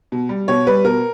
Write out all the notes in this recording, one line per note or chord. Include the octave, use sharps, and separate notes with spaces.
B2
G3
B2 C#5
G3 B4
B2 A#4